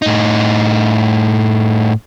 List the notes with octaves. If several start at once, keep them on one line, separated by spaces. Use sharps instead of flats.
A2 D#4